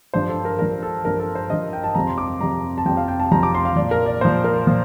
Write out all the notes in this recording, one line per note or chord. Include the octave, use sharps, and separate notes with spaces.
G2 F3 C5
A4
A#4
G2 F3 A#4
A4
G2 F3 A#4
A4
C5
G2 F3 D#5
G5
A5
F2 C3 F3 A#5
C6
D6
F2 C3 F3 A#5
A5
F2 C3 F3 G5
F5
G5
A5
F2 C3 F3 A#5
D6
C6
F5
A#2 F3 D5
A#4
D5
A#2 F3 C5
A#4
A#2 F3